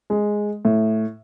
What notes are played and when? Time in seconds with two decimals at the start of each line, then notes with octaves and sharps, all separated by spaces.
0.10 G#3
0.65 A2